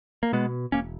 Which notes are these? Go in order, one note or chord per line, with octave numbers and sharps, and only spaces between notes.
A#3
B2 G#3 B3
E1 A#3 C#4